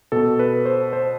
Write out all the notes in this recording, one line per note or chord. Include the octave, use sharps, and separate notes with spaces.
B2 A4
B4
C5
C5